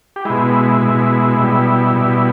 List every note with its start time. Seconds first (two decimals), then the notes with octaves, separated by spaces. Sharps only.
0.16 G4
0.25 B2 G#3 E4
0.81 B2 G#3
1.39 B2 G3
1.96 B2 G3